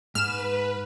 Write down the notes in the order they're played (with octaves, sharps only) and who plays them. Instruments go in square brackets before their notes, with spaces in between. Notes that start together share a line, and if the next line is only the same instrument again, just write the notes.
[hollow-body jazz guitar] G#2 [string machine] B4 [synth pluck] F6 E7